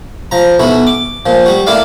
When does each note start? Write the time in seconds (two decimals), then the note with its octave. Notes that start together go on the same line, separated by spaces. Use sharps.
0.31 F3 A#5
0.59 B1 B3 E4 F#4
0.87 D6
1.26 A#2 F3
1.46 G3 F#4
1.67 A#3 E4 A4 D5 F5